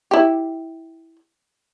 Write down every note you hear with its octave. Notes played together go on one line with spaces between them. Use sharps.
E4 G4